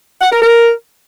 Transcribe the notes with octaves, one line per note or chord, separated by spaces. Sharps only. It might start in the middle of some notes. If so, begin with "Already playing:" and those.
F#5
A#4
A#4